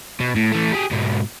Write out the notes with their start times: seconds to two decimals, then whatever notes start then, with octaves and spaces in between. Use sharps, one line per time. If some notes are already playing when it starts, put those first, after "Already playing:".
0.20 B2
0.36 A2
0.52 E3 A3
0.72 G4 G#4
0.91 G#2 B2